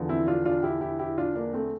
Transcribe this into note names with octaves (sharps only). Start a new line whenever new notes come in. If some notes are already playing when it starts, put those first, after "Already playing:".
Already playing: E2 D3 F3
C4 E4
D4 F4
D4 F4
E4 G4
E4 G4
E4 G4
D4 F4
A#3 D4
A3 C4